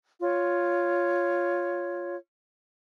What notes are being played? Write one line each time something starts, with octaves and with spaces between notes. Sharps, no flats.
F4 C#5